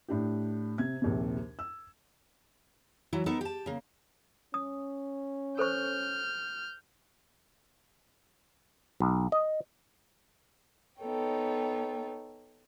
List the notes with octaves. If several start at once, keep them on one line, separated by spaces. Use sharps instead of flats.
A2 D4 G4
C3 G#6
A#1 D#2 C3
E6
E3 F#3 E4
B3 D#4 A4 A#4
G4 A5
C#3 A#3
C#4 D#6
A4 C5 C#6 F6 G6
B1
D#5
B3 D#4 A4 C#5 G5